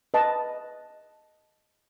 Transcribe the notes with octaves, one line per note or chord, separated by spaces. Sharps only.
B4 D#5 A5